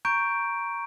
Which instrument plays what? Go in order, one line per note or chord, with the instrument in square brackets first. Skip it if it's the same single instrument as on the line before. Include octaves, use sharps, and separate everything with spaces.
[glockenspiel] A#5 C#6 G6 D7